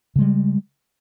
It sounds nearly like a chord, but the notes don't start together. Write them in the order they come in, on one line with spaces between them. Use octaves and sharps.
C#3 G#3 G3